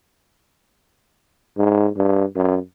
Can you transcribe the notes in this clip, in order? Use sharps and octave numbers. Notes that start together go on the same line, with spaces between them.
G#2
G2
F#2